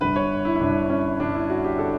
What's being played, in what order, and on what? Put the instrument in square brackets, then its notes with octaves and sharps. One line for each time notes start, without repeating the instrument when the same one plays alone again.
[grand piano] G1 G2 D3 B4
C#5
E4
E4
G1 G2 D3 D4
C#4
G1 G2 D3 D4
E4
F#4
G4
D3 A4